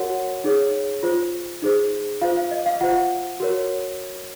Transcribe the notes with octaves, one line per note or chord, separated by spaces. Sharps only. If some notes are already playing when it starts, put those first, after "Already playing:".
Already playing: F#4 A#4 C#5 F#5
D#4 G#4 C#5
F4 C5
D#4 G#4 C5
F4 C5 F5
F5
D#5
F5
F4 C5 F#5
F#4 A#4 C#5